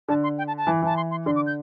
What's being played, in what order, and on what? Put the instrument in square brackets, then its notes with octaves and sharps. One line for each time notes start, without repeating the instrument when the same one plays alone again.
[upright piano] D3 [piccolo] A5
[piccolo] C6
G5
A5
A5
[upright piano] E3
[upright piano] E3 [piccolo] A5
[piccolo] C6
C6
[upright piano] D3 [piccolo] C6
[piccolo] D6
G6